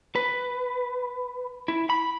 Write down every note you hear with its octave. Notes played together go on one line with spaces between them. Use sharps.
B4
E4
B5